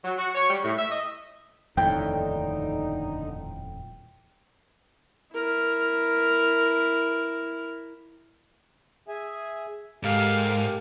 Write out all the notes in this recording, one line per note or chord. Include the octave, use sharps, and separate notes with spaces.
F#3
F#4
C#5
G3
A2
E5
D#5
D#1 F2 A2 D3 D#4 G5
E4 A#4
G#4 E5 G#5
G#2 G4 A4 A#4 F5